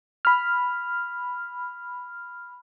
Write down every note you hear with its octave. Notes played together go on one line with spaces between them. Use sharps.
B5 F6